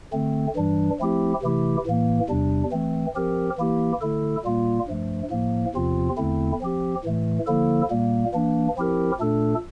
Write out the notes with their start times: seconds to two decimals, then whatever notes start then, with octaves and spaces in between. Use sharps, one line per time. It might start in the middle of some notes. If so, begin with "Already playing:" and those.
0.13 D3 A3 C4
0.56 G2 E3 G3 D4
0.99 F3 A3 C4 E4 G4
1.42 C3 E3 A3 E4 G4
1.86 A2 E3 A#3
2.29 E2 C3 G3 D4
2.72 E3 A3 C4
3.15 F3 C4 G4 A#4
3.58 E3 A#3 E4 G4
4.01 D3 A3 E4 A4
4.45 A#2 G3 A#3 F4
4.88 G2 F3 A3
5.31 A2 F3 A#3
5.75 E2 C3 F3 C4 F4
6.17 E2 D3 A3 C4 E4
6.61 F3 C4 G4
7.05 A2 E3 A3
7.47 D3 F3 A#3 E4 A4
7.90 A#2 G3 A#3
8.34 E3 A#3 D4
8.76 F3 C4 E4 G4 A#4
9.20 A#2 A3 D4 A4